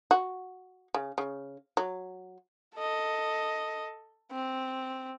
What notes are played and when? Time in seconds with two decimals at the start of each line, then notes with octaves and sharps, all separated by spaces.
0.11 F#4
0.94 C#3
1.18 C#3
1.77 F#3
2.76 A4 D#5
4.31 C4